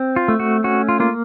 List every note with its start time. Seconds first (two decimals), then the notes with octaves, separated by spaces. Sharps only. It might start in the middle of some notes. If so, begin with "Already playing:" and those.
Already playing: C4
0.16 F4
0.28 A3
0.40 F#4
0.64 C#4 F#4
0.89 F4
1.00 A#3 F4